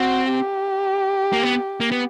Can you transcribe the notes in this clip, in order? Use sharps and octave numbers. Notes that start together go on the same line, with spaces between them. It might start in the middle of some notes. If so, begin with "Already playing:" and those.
Already playing: C4 F#4
G4
A#3
B3
A#3
B3